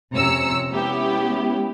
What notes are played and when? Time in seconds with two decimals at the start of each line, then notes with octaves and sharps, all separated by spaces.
0.12 F2 C3 C#4 A#5 E6 C#7
0.71 G#3 B3 C#4 E4 G4